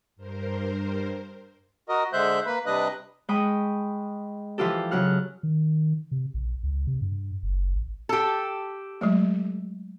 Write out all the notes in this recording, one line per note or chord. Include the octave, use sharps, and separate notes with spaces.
G2 A#4 C5
F#4 A#4 D#5
D3 G#3 C5 E5 F#6 G6
A#3 B4 B5
C3 G3 D4 B4 D#5 F#6
G#3 G5 B5 C#6 D#6
E3 F3 F4 G4 A4
C#3 F#3 F#5 F6
D#3
C3
A#1
C#2
C3
G2
F#1
A1
G4 A4
F#3 G#3 A3